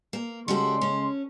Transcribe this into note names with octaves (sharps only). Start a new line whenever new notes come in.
A#3
C#3 G3 G#3 F#4 A4 C6
C#4